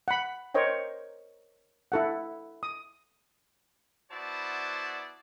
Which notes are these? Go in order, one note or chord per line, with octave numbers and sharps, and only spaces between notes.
F#5 B5
A#4 C5 C#5 D#5 G5
E4 A4 F#5
D#6
B3 E4 F#4 C5 D5 A5